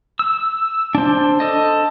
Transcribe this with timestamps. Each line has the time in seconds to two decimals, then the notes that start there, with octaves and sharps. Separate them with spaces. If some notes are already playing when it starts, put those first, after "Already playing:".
0.19 E6
0.95 D4 C5
1.40 A4 D#5